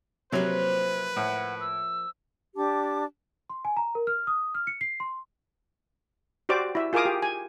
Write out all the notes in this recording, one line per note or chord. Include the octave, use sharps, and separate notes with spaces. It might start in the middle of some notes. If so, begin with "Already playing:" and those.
C3 F3 F#3 A#3 B4
A2 F#5
E6
D4 G4 A5 D6
C6
G#5
A#5
A#4
F6
D#6
F6
C#7
C7
C6
F#4 G4 C5 D5 D6
E4 E5
F4 G#4 A#4 F5 D6 D#6
G4
G#5